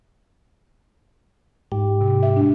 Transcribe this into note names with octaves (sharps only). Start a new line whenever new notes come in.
G#2 G4
C3
E5
D4